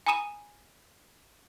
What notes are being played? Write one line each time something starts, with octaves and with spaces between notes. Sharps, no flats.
G#5 A#5 B5 D#6 D#7 E7